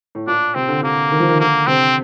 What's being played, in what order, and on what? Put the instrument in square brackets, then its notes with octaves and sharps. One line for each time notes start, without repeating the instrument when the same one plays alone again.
[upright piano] A2
[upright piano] A#2 [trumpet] D4
[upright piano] C3 [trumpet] C4
[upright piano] D3
[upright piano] D3 [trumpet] A#3
[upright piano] D#3
F3
D#3
[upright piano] D3 [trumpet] A#3
[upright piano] C3 [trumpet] C4